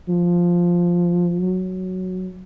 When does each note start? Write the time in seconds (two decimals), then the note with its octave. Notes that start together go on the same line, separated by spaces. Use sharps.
0.09 F3
1.40 F#3